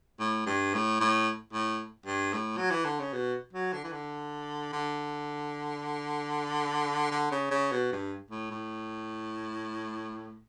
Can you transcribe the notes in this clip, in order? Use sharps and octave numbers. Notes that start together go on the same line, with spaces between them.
A2
G2
A2
A2
A2
G2
A2
F#3
E3
D3
C#3
B2
F#3
D3
E3
D3
D3
D3
C#3
C#3
B2
G2
A2
A2